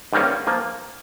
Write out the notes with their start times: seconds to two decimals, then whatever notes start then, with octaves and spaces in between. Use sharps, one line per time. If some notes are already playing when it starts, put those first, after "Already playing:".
0.13 G#2 D#3 G3 A#3 C#4
0.47 F3 A#3 F4